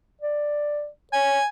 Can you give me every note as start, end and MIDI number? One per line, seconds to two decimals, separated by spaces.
0.21 0.88 74
1.13 1.39 73
1.13 1.46 80